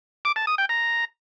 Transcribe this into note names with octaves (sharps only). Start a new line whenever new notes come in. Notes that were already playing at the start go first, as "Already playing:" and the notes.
D6
A5
D#6
G5
A#5